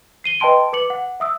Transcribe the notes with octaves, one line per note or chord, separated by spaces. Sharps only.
C7 D#7 G7
B4 D#5 G5 A5 C6 D7
B4 D6 C#7 F#7
F#5
E5 D#6 E6